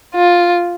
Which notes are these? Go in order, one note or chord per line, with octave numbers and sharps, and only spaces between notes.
F4